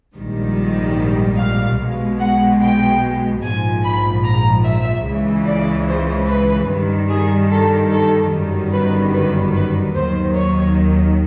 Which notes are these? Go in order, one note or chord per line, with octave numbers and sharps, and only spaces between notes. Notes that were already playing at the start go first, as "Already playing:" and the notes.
A#1 G#2 D#3 G3
F5
B1 B2 G#3
F#5
G5
A#1 G#2 F3 G#5
B5
A#5
E5
C#2 C#3 E3 G#3
D5
C5
B4
G2 D#3 G3
G#4
A4
A4
G1 F#2 D#3 G3
B4
B4
B4
D#2 D#3 F#3 C5
C#5